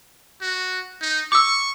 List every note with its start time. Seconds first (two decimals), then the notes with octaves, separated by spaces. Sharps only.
0.42 F#4
1.01 D#4
1.32 C#6 D6 E6